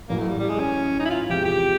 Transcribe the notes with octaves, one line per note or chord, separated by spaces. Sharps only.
A1 A2 F#3 A#3
A3
G3
G3
G#3
C#4
D#4
E4
F4
E2 C3 F3 G#3 G4
G4